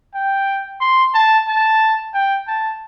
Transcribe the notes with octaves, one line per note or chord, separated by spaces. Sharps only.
G5
C6
A5
A5
G5
A5